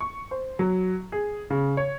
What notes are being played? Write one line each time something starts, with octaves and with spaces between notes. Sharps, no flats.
C#6
C5
F#3
G#4
C#3
C#5